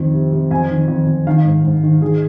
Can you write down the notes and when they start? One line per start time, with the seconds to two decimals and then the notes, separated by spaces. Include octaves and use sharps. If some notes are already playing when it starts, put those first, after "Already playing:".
Already playing: F2 D#3
0.14 C3
0.32 C3
0.51 F2 G#5
0.70 D#3
0.88 F2
1.07 F2
1.27 D#3 F5
1.45 G#2
1.64 G#2
1.83 D#3
2.01 D#3 G#4